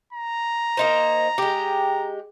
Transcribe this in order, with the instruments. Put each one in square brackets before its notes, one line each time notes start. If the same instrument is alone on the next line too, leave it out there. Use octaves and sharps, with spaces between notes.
[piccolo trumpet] A#5
[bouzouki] A#3 D#4 C5
G#3 G4